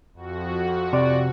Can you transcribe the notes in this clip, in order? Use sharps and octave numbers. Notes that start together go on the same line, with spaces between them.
F2 F#4
C3 D5